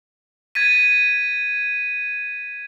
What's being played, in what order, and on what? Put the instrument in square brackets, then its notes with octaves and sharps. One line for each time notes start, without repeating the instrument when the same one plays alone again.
[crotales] G#6 A6 B6 D#7